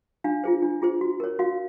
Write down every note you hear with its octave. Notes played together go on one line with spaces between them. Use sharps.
D4 F5
F4 G#4 C5
D4
F4 G#4 C5
F#4
A#4 C#5
F#4 F5